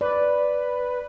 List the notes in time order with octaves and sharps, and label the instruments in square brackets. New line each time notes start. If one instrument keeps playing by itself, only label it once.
[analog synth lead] B4 [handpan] D5